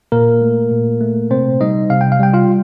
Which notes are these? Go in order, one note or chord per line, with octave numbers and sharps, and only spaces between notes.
A#2 A#3 A#4
A3
A#2
A3
C3 C4 C5
G3 D#4 D#5
C3 F5
G5
F5
G3 G5
F4 F5